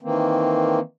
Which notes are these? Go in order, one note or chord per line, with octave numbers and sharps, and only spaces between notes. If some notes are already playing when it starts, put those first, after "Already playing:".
D#3 E3 A#3 C4